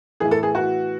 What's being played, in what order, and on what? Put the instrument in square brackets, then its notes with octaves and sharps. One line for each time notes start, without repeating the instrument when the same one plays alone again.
[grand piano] A2 E3 B3 E4 [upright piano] G#4
[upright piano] A4
G#4
F#4